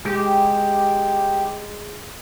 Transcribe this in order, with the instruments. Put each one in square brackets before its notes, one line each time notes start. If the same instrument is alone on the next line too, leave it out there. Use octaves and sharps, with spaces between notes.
[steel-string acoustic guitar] G#3 [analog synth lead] G4